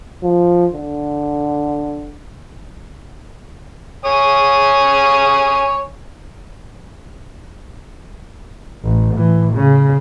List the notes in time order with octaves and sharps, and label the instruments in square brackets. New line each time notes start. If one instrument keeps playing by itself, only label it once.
[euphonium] F3
D3
[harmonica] C#5 G#5 D#6
[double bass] A1
A2 E3
C#3